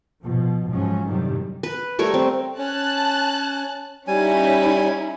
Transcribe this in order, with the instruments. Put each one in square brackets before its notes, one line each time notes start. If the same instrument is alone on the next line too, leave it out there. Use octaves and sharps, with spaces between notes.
[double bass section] B2 F3
G#2 F3 F#3 G#3 C#4
F#2 A2 C3 D#3 F#3 G3
[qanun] B4
G3 A3 A#4 C#5
C4
[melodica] C#4 [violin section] A5 F#6
[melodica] G3 G#5 [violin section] C#4 D#4 E4